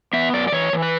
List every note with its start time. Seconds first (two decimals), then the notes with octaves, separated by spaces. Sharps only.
0.13 B3 E5
0.33 F#2 D5
0.47 D5
0.52 E3 C#5
0.73 E3
0.82 B4